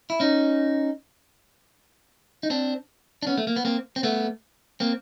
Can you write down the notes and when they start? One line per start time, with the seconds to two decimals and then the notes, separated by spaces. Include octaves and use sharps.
0.10 E4
0.20 C#4 D#4
2.43 D#4
2.50 C4 D4
3.23 D4
3.27 B3 C#4
3.38 A3
3.47 A#3
3.56 B3
3.65 A#3 C4
3.96 C4
4.03 A3 B3
4.80 A#3 C4